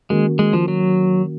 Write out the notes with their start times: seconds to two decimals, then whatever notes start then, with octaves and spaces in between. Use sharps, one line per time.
0.10 D#3 G#3 A#3 C#4 F#4 A#4
0.39 G#3
0.53 F3
0.68 F#3